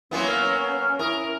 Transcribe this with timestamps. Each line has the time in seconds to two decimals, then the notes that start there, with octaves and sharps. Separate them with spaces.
0.11 F#3 A#3 B3 C#4 E4 G#5 C6
0.28 A#4 F5 F6
0.99 E4 A#4 D#6